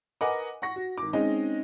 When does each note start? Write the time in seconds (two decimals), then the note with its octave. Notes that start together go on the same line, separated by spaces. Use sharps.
0.21 A#4 B4 D#5 F#5 G#5 D6
0.62 F#5 C#6 A#6
0.76 F#4
0.98 G#1 D6
1.13 G#3 C4 C#4 D#4 D#5